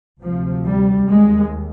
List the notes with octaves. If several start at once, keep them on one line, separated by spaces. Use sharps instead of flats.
D2 C3 F3
G3
D#2 G#3